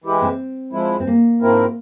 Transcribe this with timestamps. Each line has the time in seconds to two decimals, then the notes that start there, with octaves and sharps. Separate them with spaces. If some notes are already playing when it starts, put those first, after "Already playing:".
0.04 E3 G#3 E4 G4
0.22 C4
0.72 F3 G#3 E4
1.00 C4
1.07 A#3
1.41 G#2 F3 C4 E4 A#4